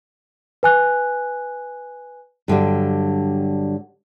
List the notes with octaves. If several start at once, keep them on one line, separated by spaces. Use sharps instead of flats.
B4 G#5 F#6
G2 D3 F#3 G3